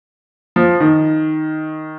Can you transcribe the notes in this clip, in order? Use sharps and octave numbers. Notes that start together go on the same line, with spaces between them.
F3
D#3